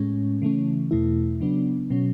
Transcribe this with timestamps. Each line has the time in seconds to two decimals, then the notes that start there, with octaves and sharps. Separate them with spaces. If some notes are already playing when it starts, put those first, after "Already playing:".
Already playing: A2 G#3 C#4
0.42 C#3 E3 A3 C#4
0.91 E2 B2 A3 E4
1.41 C#3 F#3 B3 D4
1.90 B2 F#3 C#4